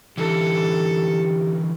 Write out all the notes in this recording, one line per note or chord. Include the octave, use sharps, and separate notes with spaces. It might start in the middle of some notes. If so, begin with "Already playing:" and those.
D3 E3 G4 A4